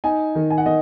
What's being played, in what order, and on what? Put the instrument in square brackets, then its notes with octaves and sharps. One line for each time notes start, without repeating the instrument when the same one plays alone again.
[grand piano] D#4 G#5
D#3
G#5
F#5
D#3 D#5